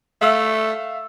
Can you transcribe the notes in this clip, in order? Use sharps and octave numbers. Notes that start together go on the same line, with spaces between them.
A3 E5 F5 E6